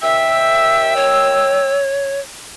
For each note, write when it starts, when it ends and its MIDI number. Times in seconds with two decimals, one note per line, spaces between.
0.02 1.78 39
0.02 0.96 76
0.02 1.78 79
0.02 1.78 88
0.96 2.20 73